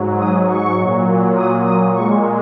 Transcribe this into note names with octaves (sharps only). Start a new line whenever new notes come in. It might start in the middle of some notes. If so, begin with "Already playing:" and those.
Already playing: G#2 F#3
D#6
C#6
A#2 F#3
D#6
D#6
A#2 G#3 C#6